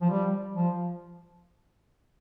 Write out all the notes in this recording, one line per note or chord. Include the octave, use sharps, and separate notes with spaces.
F3
G3
F3